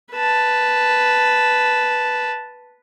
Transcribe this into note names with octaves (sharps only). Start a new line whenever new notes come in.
B4 A5